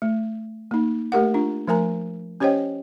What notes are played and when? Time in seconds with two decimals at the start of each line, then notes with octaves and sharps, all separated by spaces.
0.02 A3
0.71 A#3 D#4
1.12 A3 G4 A#4 F#5
1.34 D4 F4
1.68 F3 A3 A#4 G#5 A#5
2.40 C#4 G4 C5 C#5 D#5 G5